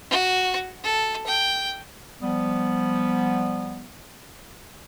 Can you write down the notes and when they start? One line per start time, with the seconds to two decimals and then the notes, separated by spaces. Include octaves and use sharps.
0.11 F#4
0.84 A4
1.27 G5
2.21 F3 G3 B3